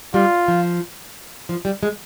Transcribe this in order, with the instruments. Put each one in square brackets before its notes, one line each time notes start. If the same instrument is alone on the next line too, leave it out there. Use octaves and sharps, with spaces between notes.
[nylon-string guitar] G3 [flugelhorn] F4
[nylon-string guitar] F3
F3
G3
G#3